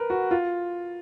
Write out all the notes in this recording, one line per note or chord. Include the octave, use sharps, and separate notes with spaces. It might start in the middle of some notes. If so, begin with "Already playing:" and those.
Already playing: A#4 B4
F#4
F4